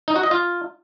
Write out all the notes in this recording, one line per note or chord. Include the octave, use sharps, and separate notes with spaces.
D#4
F#4
D#5
F4